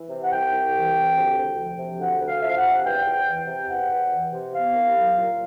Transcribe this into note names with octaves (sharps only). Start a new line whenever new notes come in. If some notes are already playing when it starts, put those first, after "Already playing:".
Already playing: E3
C3
F#5
C2 G5
C2
E3
C3
D2
D2
F3
C3
D2 F#5
D2
F5
F3 E5
F5
F#5
C3
E2 G5
E2
E3
C3
E2 F#5
E2
E3
C3
B3 F5
C2
F#3
A#2